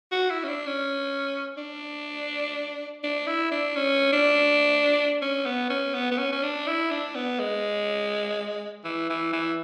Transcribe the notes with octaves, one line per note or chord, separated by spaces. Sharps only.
F#4
E4
C#4
D4
C#4
D4
D4
E4
D4
C#4
D4
C#4
B3
C#4
B3
B3
C#4
C#4
D4
E4
D4
B3
G#3
E3
E3
E3